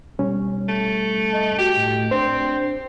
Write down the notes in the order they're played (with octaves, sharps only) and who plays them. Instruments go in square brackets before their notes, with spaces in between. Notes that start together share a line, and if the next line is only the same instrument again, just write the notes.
[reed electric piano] B2 G3 C#4
[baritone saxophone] A3
[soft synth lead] D#5
[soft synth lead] F#4 [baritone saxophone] G4
[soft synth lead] A2
[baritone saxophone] C4 [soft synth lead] D4 [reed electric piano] C5